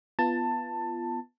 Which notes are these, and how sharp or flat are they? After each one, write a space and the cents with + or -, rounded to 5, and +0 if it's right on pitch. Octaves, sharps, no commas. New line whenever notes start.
B3 +0 F4 -25 A5 +15